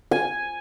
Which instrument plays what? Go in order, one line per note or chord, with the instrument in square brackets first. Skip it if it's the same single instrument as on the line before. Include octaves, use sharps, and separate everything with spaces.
[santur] G#5